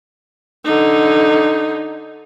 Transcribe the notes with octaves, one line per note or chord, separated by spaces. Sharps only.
D3 D#4